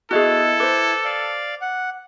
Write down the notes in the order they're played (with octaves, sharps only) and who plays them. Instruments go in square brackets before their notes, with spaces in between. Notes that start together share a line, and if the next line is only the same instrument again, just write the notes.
[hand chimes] B3 D#5 F#6 [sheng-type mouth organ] E4 [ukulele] F#4 G#4 [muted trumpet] A4
[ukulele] B4 C5 [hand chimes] D6
[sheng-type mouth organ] D5 F5
F#5